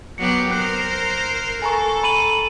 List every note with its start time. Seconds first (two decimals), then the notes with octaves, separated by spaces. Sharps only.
0.18 F#3 B3 G4 C#7
0.51 A#4 C5 F#6
1.62 A4 G#5 A#5 C#6
2.04 B5 D#7 F#7